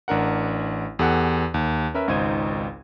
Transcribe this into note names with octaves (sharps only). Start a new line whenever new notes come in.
A1 D4 A#4 F#5
E2 G4 A4 F#5 G#5 F#6
D#2
C#4 A#4 B4 E5
G#1 C#2 D#4 C5 G#6 D#7